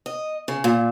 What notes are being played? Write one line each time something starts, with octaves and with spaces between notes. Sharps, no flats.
D#5
C#3
A#2